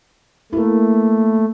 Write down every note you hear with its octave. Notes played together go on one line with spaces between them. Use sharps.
A3 A#3 E4